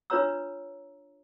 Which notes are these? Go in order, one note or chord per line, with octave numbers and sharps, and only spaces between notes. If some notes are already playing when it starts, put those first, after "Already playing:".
D4 F4 B4 C#5 A#5 E6